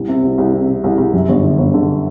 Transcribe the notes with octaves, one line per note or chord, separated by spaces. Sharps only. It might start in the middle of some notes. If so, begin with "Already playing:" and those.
Already playing: C2
C3
C2
C2
C3
C3
C2
C2
F#2
G1
D3
G1
D3